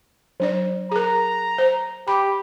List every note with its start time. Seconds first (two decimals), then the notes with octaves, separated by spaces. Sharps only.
0.40 F#3 D4 D5
0.91 G#4 A#4 A#5
1.58 C5
2.08 G4 B5 D6